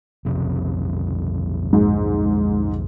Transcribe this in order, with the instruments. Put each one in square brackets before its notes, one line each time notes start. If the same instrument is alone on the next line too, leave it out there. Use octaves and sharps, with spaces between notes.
[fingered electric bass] B1 F2 C3
[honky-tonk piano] G#2